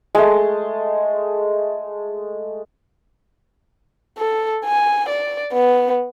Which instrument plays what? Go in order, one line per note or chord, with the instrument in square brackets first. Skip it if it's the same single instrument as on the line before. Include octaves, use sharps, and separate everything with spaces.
[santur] G#3 A3
[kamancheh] A4
G#5
D5
B3